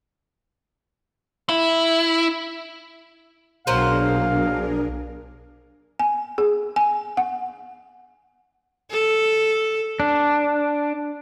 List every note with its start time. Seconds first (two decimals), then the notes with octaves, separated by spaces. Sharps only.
1.49 E4
3.67 B1 F#3 A#3 D4 G#4 A#4 C5 F5
5.99 G#5
6.38 G#4
6.76 G#5
7.17 F#5
8.91 A4
10.00 D4